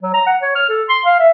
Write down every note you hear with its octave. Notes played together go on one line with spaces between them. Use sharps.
F#3
A#5
F#5
C#5
F6
A4
C6
F5
E5